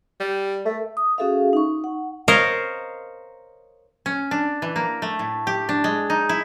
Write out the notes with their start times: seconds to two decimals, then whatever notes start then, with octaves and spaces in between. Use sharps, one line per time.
0.20 G3
0.66 A3 A4 A#4 E5
0.97 D#6
1.18 C#4 F#4 G#4 A4 E5 F5
1.53 D#4 C#6
1.84 F#5
2.28 A#4 C5 C#5 D#5 F5
4.06 C#4
4.31 D4
4.62 E3
4.76 A#3
5.02 A3
5.19 A2
5.47 G4
5.69 D4
5.84 G#3
6.10 D#4
6.29 E4